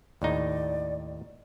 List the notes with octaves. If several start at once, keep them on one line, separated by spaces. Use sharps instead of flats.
D#2 A2 D#4 D5